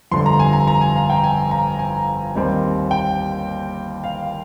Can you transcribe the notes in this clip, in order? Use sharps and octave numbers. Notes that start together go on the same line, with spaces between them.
G1 F2 D3 G3 C6
A#5
G#5
A#5
A#5
G#5
F5
G5
G#5
A#5
G#5
D#2 D#3 G3 C4
G5
F5